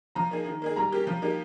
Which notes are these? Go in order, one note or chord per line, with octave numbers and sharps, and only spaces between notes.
F3 A#5
A#3 D#4 G#4
D#3
A#3 D#4 G#4
G3 A#5
A#3 C#4 G4
F3
A#3 D#4 G4